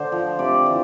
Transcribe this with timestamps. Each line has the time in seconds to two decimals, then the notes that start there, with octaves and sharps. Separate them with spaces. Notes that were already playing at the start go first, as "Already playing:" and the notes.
Already playing: D3 C5
0.12 F3
0.39 C3 D5
0.66 E3